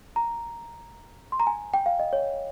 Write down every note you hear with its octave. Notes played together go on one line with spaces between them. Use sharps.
A#5
C6
A#5
G#5
G5
F5
D#5
C#5